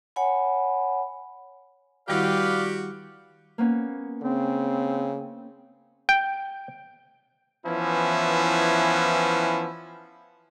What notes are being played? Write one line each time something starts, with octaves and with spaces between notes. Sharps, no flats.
C#5 F#5 G#5 B5
D#3 G3 E4 F#4 G4 B4 D5 F5
A#3 B3 C#4
C#3 C4
G5
E3 F3 B3 C#4 E4